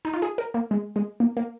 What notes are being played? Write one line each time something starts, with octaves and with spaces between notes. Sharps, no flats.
D#4
F4
G#4
A#4
A#3
G#3
G#3
A#3
A#3